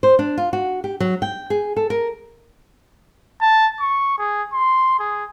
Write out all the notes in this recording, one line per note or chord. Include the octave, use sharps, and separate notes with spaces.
C5
D4
F4
F#4
G4
F#3
G5
G#4
A4
A#4
A5
C#6
G#4
C6
G#4